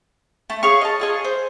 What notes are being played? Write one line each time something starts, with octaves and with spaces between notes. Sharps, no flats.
A3
G#4 C#5 F5 C#6
D#5 A5
F4 G#4 D#5
C5